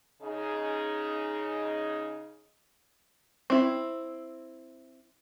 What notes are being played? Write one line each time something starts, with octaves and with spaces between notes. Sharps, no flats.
C#3 D#4 G#4
C4 E4